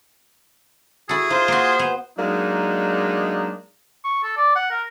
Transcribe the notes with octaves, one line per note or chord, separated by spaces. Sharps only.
E4 F#4 G#4 A4
D#4 F4 C5
A#3 F#4
B3
F#3 G#3 A#3 D4 D#4
C#6
A4
D5
F#5
A#4